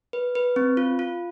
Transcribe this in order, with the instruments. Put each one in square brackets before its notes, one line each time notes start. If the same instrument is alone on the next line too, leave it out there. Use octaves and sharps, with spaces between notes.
[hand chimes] B4
B4
C4
F4
F4